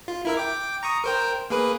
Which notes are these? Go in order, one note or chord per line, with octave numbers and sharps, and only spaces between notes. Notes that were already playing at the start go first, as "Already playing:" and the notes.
F4
E4 A#4 E5
G5 D6
A#5 C#6 D#6
A#4 C5 G5
A#3 G#4 B4